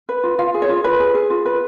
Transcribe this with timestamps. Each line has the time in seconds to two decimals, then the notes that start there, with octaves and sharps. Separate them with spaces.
0.09 B4
0.24 F4
0.39 F4 F5
0.54 G#4
0.62 C#5
0.69 F4
0.84 F4 B4
1.00 G#4
1.14 G#4
1.30 F4
1.45 B4